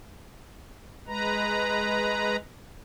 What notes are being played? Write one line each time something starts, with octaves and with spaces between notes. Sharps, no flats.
G#3 B4 A#5